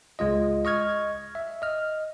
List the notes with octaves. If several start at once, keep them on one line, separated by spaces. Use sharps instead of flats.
C#2 G#3 F4 D#5
D#5 C#6 F6 G#6
E5
D#5 F6